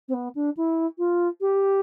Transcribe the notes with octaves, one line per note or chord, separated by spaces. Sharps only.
C4
B3
D4
E4
F4
G4